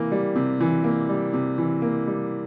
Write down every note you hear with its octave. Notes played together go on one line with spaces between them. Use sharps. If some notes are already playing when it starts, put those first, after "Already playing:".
Already playing: C3 E3 A#3
G3
C3
E3
A#3
G3
C3
E3
A#3
G3